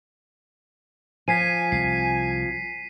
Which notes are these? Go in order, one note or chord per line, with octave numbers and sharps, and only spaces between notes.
F3 G#5 B6 C7 D#7
C2 C7